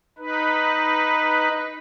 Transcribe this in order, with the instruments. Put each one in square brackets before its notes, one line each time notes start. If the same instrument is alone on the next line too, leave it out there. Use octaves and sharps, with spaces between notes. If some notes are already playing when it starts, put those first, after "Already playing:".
[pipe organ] D#4 B4